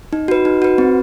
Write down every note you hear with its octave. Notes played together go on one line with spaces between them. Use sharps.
D#4
F#4 B4
D#4
F#4 B4
C4